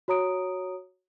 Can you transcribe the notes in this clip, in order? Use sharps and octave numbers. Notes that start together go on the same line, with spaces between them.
F#4 C#5 A#5 D#6 D7